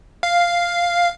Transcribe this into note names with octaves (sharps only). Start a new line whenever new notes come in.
F5